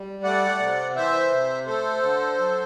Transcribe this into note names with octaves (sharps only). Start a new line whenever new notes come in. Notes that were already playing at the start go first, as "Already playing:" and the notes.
Already playing: G3
A3 D5 F#5
C3
E3 C5 E5
C3
A3 A4 C5
D3
F#3